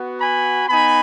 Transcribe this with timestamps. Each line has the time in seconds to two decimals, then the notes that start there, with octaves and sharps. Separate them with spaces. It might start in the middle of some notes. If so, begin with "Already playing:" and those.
Already playing: B3 F#4
0.21 G#5 B5
0.69 B3 D#4 G#5 B5